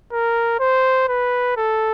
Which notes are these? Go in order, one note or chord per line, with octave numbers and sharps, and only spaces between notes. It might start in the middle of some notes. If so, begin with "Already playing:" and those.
A#4
C5
B4
A4